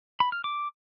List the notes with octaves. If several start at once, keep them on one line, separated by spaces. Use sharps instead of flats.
B5
F6
D6